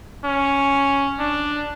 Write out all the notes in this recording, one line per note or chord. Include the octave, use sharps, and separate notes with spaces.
C#4
D4